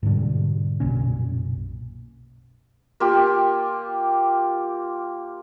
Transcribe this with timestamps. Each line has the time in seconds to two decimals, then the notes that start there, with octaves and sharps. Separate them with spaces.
0.03 G#2 B2 D3 G3
0.80 F#1 B1 A#2 C#4
3.00 A#3 F4 G4